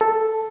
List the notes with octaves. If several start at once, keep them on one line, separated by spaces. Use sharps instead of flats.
A4